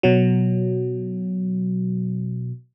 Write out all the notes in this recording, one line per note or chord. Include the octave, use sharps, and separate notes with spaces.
B2 F#3